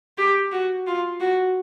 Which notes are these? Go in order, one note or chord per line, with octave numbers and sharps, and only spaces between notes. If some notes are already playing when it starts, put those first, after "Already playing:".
G4
F#4
F4
F#4